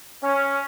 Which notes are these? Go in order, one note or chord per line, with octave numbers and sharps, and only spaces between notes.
C#4